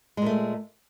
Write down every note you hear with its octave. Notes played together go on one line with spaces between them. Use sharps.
A#2 G#3 A3